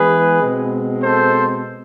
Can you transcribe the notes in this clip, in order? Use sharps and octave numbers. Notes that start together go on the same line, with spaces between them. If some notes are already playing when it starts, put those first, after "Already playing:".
Already playing: E3 G#3 B3 G#4 B4
B2 G#3 C4
A4 C5